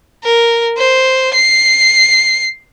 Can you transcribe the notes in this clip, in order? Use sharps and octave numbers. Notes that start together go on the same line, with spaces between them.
A#4
C5
C7